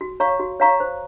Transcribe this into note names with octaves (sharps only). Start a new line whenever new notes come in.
F#4
C#5 F5 A#5 C#6
F#4
C#5 F5 A#5 C#6
C5